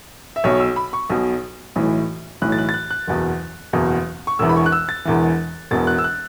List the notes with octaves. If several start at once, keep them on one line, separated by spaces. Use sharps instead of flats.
E5
B1 B2 C#5
E6
B5
C#6
B1 B2
B1 A2 E3
B1 A2 E3 F#6
A6
F#6
A6
F#6
F#6
F#1 E2 B2
F#1 E2 B2
C#6
E1 E2 E3 E6
B5
C#6
F#6
E6
A6
E1 E2 E3
E1 E2 B2 A6
F#6
E6
F#6